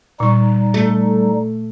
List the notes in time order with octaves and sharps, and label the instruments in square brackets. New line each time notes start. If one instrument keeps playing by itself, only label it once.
[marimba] A#2 C#6 [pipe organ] G3 D#4
[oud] A3